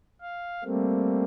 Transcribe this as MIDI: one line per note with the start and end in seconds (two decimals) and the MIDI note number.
0.21 0.64 77
0.64 1.24 55
0.64 1.24 57
0.64 1.24 58
0.64 1.24 60